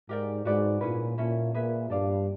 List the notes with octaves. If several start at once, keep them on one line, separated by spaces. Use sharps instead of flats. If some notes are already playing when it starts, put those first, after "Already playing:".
G#2 G4 A#4 D5 G5
G#2 F#4 B4 D5 G5
A#2 C#4 E4 G#4 B4
A#2 C#4 E4 A4
A#2 G#4 B4 E5
G2 A4 D5 F5